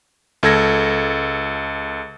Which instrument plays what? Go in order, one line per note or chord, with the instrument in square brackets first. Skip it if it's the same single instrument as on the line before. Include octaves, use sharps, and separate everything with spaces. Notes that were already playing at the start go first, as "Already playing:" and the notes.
[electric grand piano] C#2 A4 G#6 A#6